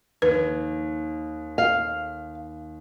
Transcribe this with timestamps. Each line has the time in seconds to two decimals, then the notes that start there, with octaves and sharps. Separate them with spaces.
0.22 D#2 B4
1.58 F5